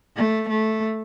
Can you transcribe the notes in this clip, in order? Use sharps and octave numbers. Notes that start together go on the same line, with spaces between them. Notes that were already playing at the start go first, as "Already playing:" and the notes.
A3
A3